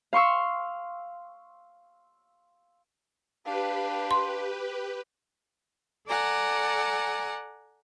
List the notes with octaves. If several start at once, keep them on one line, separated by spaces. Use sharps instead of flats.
F5 C6 C#6 E6
D4 G4 B4 F5
C6
A4 D5 F#5 G#5 A#5